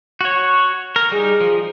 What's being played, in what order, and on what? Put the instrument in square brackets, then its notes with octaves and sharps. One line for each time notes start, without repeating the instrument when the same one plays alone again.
[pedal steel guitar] F#4 C#5
A#4
[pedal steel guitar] G3 D#4 [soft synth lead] G#4
[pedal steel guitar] F3